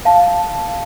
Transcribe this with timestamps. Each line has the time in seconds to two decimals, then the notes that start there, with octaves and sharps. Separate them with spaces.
0.05 F5 A5